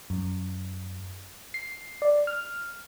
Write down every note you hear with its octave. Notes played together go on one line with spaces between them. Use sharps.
F#2
C7
D5
F6